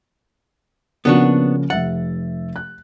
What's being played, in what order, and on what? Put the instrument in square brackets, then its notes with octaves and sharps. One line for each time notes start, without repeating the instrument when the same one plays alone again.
[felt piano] C#3 F3 A#3 [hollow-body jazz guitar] B3 D4 F#4
[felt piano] F1 E5 A6 [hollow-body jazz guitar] F#5
[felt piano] F#6